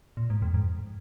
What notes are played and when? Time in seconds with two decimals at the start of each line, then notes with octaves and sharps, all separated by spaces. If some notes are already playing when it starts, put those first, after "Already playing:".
0.17 A#2
0.30 G#2
0.42 F2
0.54 G#2